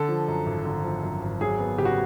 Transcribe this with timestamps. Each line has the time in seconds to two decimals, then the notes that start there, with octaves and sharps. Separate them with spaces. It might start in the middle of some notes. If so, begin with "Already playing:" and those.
Already playing: D3 A4
0.09 F3
0.28 F#2
0.46 G#1
0.65 D3
0.84 F3
1.03 F#2
1.22 G#1
1.41 F#3 G#4
1.60 B3
1.78 C#3 G4
1.85 F#4